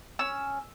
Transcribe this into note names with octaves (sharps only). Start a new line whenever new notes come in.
C#4 E6